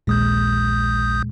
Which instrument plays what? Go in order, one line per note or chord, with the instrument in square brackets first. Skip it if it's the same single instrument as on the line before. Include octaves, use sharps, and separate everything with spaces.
[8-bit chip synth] A#1 D#6 G6 [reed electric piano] D#2 A#2 G#3